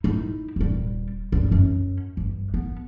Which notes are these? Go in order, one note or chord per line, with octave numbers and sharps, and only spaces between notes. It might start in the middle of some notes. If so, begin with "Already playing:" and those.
D#4 E4
D#1 G3
C#2 G2
F#2 C#4
G1
B3